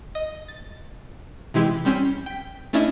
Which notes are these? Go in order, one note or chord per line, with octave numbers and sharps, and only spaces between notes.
D#5
A6
C3 E3 G#3 E4 G4
G3 C4 C#4 G5 B6
G5 B6
A3 C#4 D4 E4 D#5 E5